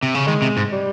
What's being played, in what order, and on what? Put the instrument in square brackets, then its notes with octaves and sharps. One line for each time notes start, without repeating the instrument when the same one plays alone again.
[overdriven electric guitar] C3
C#3
[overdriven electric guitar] D#3 [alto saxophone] G#3
[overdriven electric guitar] C3
G#2
[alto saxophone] G3